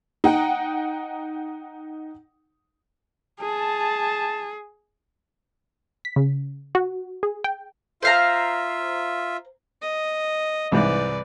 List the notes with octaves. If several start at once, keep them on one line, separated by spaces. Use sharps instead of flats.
D#4 F#5 G5
G#4 A5
B6
C#3
F#4
G#4
G5
F4 C5 E5 F5 A#5
D#5
C2 G#2 E3 B4 D5